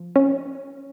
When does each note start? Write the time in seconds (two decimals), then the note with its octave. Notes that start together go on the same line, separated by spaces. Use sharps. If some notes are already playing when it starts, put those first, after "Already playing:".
Already playing: F3
0.16 C#4